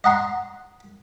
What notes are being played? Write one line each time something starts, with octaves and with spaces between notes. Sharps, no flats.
D#5 F#5 A#5 C6